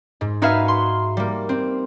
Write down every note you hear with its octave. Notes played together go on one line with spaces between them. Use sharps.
G#2
D#4 F#4 G#4 B4 E5 F5
C6
G3 A#3
C4